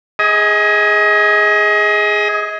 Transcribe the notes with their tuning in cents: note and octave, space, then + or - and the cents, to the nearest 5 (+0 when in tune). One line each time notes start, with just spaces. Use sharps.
G#4 +0 D#5 +30